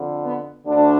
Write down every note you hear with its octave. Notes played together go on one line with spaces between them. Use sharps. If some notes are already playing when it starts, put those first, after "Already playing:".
Already playing: F2 D3
B3
D2 D3 D4